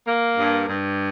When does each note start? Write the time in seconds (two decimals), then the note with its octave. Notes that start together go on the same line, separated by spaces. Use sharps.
0.07 A#3
0.37 G2
0.69 G2